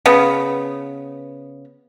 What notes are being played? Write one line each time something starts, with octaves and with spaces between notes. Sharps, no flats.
C#3 B3